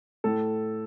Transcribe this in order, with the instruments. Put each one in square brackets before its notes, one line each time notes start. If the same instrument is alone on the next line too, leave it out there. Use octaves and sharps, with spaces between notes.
[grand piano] A2 A4